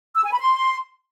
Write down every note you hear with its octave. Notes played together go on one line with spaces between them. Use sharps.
E6
G#5
B5
C6